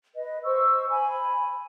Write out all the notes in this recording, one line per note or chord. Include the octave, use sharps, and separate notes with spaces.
B4 D#5
C5 C#6 E6
G#5 B5